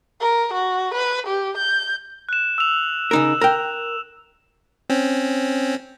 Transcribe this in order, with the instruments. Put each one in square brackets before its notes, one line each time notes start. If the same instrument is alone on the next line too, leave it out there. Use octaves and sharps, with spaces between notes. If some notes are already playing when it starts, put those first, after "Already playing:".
[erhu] A#4
F#4
B4
G4
G6
[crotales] F#6 E7
E6 F7
[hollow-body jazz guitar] C#3 D#4 A#4 [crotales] E7
[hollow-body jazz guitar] A#4 G5
[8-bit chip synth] C4 C#4